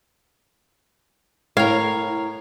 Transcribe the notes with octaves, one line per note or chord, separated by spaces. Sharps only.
A2 E4 A#4 C#5 F5